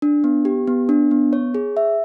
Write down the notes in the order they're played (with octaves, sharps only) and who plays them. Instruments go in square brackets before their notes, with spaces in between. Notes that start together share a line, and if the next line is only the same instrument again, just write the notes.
[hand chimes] D4
B3
G4
B3
D4
B3
C#5
G#4
E5